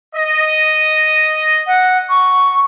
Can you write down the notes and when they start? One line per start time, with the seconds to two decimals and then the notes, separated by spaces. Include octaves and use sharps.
0.15 D#5
1.67 F#5
2.10 C#6